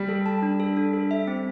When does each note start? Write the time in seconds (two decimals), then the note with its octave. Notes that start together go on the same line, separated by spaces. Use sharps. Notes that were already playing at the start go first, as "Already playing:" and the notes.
Already playing: G3
0.09 A4
0.26 A5
0.42 D4
0.60 A4
0.77 D4
0.94 A4
1.11 E5
1.27 C4